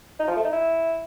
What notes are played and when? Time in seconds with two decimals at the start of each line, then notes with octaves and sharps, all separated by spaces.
0.20 D#4
0.28 F3
0.36 A3
0.45 D#4
0.53 E4